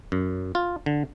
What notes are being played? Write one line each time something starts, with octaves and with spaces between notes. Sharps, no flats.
F#2
F4
D3